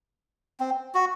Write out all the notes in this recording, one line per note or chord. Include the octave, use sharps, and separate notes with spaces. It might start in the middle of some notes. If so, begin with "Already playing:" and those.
C4
F#4